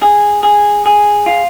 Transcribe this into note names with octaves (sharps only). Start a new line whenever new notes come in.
G#4
G#4
G#4
F4